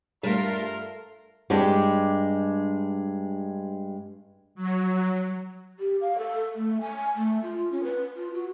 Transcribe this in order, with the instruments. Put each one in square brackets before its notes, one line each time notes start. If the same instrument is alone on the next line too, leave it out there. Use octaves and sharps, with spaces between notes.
[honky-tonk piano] G2 [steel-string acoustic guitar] A3 [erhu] F4 [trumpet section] A#4
[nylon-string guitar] G2 G3 G#3 D4 G4
[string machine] F#3
[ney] G4
F5
A4
A3
G#5
A3
F4
C#4
B4
F4
F#4